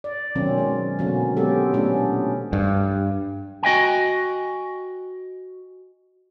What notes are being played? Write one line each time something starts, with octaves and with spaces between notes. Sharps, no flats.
D5
B2 D#3 F#3 C4 C#4
G#3
B2 D3 F#3 A#3 C#4
G#3 B3 C4 G4 A4
A#2 A3 B3 C#4 D4
G2
F#4 D#5 E5 G5 G#5